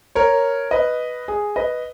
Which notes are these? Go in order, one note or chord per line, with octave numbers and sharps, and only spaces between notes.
A#4 C#5
B4 D#5
G#4
B4 D#5